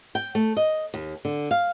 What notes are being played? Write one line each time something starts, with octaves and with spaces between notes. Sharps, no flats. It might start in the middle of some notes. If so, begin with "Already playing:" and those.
G5
A3
D#5
D#2
D3
F5